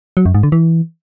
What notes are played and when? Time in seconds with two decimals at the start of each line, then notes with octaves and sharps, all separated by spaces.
0.17 F#3
0.26 F#2
0.34 G#2
0.43 D3
0.52 E3